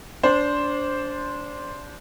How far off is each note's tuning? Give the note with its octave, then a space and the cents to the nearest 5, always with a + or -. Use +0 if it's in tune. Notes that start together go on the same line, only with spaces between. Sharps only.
D4 -20 C5 +0